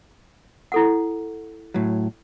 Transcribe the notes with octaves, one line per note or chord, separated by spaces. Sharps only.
E4 A4 F#5
A2 F#3